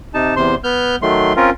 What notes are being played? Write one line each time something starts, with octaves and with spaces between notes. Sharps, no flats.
C3 D#4 A5
E2 C3 C5 C6
B3 F6 G6
D#3 F#3 A3 C6
C4 C#4 F4 A#4